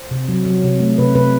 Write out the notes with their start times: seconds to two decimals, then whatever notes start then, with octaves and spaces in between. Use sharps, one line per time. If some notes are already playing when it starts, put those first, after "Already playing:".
Already playing: C5
0.11 C3
0.29 F#3
0.45 F#3
0.63 C3
0.80 A3
0.98 C3 B4
1.15 C3 B4